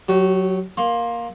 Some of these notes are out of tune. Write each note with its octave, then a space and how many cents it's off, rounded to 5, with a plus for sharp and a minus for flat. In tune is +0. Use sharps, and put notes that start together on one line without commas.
F#3 -5 G4 -40
A#3 +10 C6 +20